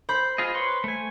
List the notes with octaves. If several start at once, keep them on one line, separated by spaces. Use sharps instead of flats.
C5 B5 G6
F4 G#4 D#5
B4 C#5 C6
A3 G#5